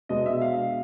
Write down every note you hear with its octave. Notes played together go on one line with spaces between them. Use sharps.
B2 G#3 B3 D4 D#5
E5
F5